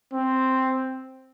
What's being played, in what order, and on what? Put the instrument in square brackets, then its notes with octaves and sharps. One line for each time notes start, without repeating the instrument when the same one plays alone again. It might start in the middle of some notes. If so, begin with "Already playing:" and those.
[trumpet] C4